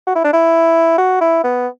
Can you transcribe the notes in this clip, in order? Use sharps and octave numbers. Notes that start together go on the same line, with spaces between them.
F#4
E4
D4
E4
F#4
E4
B3